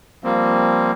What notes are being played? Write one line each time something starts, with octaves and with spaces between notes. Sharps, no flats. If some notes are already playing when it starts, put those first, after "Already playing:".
F3 G3 A#3 C4